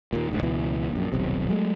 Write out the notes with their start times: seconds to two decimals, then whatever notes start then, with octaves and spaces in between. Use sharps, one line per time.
0.13 D#2 A#2
0.31 F#1 D2 G#2
0.43 C#2 B2 E3
0.92 A#1 F#2
1.12 D#1 B1 C3
1.49 F#3 G#3 A3